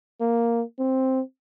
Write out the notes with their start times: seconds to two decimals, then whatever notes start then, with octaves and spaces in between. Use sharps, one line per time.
0.21 A#3
0.79 C4